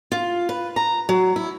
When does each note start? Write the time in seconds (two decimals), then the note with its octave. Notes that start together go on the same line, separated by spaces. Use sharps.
0.12 F4
0.49 B4
0.76 A#5
1.09 F#3
1.36 E4